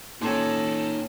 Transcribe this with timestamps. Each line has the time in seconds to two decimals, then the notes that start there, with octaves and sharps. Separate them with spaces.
0.22 A#2 C#4 D#4 A4 G5